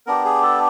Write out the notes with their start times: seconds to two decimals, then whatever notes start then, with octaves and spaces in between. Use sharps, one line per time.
0.07 B3 D4 G4 A#4
0.25 G#4
0.43 A4